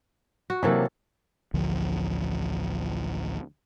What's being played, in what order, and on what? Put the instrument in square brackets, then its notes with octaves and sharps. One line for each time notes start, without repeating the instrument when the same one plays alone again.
[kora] F#4
[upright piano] C3 A#3 [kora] E3 F#3 A4
[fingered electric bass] A1 D2 D3 F3